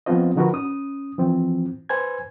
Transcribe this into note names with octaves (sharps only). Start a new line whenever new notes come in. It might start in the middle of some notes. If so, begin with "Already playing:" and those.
F3 B3 C4 F4 C5 D#5
D3 F3 D#4 F#4 A#4 B4
C#4 D#6
E3 F3 C4
B4 C5 G#5 G#6